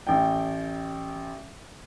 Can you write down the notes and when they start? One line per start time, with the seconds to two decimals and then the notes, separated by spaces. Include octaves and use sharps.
0.07 A1 G5